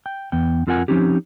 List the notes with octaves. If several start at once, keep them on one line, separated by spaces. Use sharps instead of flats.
G5
E2 B3 G5
F2 C4 F4 A#4 F#5 G#5
F3 C4 C#4 D#4 G4